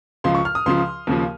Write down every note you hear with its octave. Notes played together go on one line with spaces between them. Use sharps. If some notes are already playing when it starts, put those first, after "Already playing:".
C#2 C#3 F3 C6
C#6
F6
D#6
C#2 C#3 F3 C6
D#2 C#3 F3